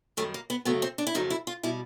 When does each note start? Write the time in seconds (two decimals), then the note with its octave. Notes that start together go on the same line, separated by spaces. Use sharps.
0.17 F#2 D#3 G3 A3
0.34 A#3
0.50 B3
0.65 F#2 C#3 F#3 A3 B3
0.82 C4
0.98 D4
1.07 E4
1.14 F2 C#3 F#3 A3 D#4
1.30 E4
1.47 F4
1.63 B2 G3 E4